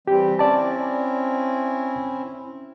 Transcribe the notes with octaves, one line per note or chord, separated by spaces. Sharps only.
E3 G3 C4 G4
C4 C#4 E4 D5 A5